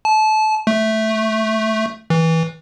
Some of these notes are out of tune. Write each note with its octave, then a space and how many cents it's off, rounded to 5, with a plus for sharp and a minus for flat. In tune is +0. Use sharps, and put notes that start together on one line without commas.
A5 -25
A3 -5
E3 -20